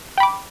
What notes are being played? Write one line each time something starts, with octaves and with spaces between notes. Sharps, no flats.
G5 B5 D6